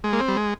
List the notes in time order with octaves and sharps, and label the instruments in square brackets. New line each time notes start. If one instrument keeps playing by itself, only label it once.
[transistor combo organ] G#3
A#3
C4
G3
G#3